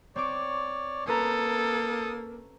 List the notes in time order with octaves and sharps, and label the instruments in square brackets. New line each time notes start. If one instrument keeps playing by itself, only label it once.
[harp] C4 C#6 D6 [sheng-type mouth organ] C#5 D5
[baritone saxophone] A#3 [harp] C#4 B4 A#5 [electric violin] A4 [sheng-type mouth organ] D#6